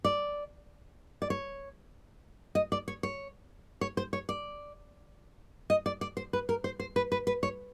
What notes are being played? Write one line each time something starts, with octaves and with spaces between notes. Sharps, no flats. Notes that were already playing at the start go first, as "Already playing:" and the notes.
D5
D5
C#5
D#5
D5
C#5
C#5
C#5
C5
C#5
D5
D#5
D5
D5
C5
B4
A#4
C5
C5
B4
B4
B4
C#5